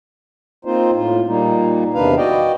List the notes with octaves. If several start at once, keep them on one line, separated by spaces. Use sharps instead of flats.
A#3 C4 D#4 F4 C5
A2 F4
A#2 G3 A#3 D#4
E2 C3 D#3 D4 B4 F5
F#4 D5 D#5 G5